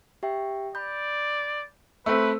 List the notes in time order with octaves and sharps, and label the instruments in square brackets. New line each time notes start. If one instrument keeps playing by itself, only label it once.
[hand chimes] G4 E5 G5
[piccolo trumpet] D5 [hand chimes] B5 G6
[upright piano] A3 C4 [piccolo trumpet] B4 [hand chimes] E6